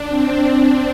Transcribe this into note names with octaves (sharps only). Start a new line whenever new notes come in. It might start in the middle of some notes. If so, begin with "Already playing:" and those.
Already playing: D4
C4